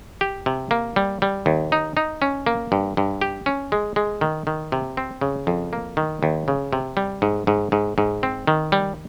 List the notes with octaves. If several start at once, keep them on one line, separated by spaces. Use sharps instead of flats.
G4
C3
A#3
G3
G3
D#2
D#4
D#4
C#4
A#3
G2
G2
G4
C#4
G#3
G#3
D#3
D#3
C3
C4
C#3
F2
A#3
D#3
D#2
C#3
C3
G3
G#2
G#2
G#2
G#2
C4
D#3
G3